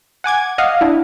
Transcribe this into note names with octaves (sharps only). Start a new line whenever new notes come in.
F#5 G#5 D6 G#6
D#5 F5 F#5
D4 E4